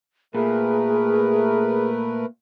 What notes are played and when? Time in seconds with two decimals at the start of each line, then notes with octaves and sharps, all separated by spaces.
0.35 A#2 A3 G#4 A#4 B4